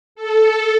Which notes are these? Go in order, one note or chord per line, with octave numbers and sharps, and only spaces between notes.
A4